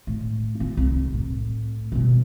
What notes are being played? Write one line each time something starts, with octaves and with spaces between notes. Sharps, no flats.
A2
F4
C2
A2
B2 G3